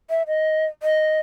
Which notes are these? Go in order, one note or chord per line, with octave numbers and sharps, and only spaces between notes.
E5
D#5
D#5